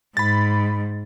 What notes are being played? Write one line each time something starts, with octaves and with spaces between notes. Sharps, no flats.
G#2 B5 A6